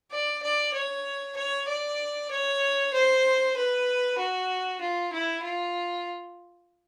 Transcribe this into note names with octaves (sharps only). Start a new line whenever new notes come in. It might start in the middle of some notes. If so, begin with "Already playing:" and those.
D5
D5
C#5
C#5
D5
C#5
C5
B4
F#4
F4
E4
F4